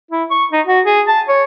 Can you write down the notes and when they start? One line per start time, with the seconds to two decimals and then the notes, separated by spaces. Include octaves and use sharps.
0.11 E4
0.31 C#6
0.52 D#4
0.66 F#4
0.85 G#4
1.07 A5
1.29 C#5